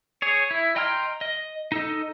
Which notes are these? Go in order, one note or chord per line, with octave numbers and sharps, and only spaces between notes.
G#4 C#5
E4
D#5 G5 A#5 C6 F6
D#5
D#4 A4 D#5